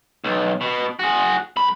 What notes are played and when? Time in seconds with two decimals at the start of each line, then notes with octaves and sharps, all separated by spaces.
0.24 B1
0.61 B2
0.99 F#4 G#4
1.56 C2 B5